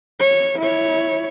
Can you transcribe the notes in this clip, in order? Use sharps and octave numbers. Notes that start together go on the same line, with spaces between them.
C#5
E4 C#5